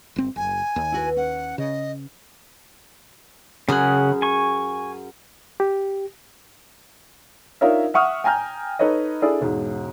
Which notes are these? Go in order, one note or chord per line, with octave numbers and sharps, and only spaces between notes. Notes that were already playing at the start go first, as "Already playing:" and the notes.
G1 C4
F#1 G#5
D#2
E4 F#4 B4
C#4 F#5
C#3 D#5
F#2 C#3 G#4 F#5
G#5 C#6
G4
D4 D#4 F4 A#4 C#5 E5
E5 F#5 C#6 D#6 F6
G5 G#5 A#5 F6 G6
D#4 A4 B4 C#5 D#5
D4 E4 G#4 A4 D5
E1 G#2